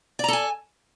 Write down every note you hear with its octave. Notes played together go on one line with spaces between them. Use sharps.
A4 D5 G#5 A#5